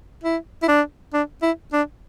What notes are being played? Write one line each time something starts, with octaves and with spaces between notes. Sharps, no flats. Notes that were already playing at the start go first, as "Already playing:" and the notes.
E4
E4
D4
D4
E4
D4